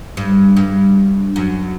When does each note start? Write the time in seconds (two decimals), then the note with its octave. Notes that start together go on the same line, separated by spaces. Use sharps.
0.17 G2
0.57 G2
1.36 F#2